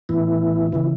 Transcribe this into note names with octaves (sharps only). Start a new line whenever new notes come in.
A2 E3 B3 E4
C#3 E3 B3 E4